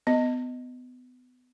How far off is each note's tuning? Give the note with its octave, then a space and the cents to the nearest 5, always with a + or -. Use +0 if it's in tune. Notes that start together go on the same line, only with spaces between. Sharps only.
B3 +25 D#5 +0